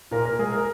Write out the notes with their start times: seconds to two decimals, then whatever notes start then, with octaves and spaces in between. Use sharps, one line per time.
0.11 A#2 A#4
0.25 A#4
0.39 G#3 G#4
0.52 A#4